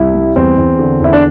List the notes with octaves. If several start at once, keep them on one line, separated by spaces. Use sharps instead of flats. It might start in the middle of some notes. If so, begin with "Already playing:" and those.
Already playing: C2 E4
G3
E2 C4
E2
D3
E2 E4
D4